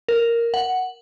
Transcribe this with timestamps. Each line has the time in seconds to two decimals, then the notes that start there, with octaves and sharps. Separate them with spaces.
0.08 A#4
0.54 F#5